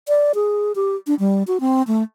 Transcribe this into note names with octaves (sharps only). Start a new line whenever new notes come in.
D5
G#4
G4
D4
G3
F#4
C4
A3